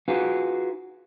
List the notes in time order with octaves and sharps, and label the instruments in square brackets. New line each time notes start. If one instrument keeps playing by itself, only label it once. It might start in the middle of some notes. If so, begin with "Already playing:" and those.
[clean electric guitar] D#4 F4 F#4 G#4 B4 F5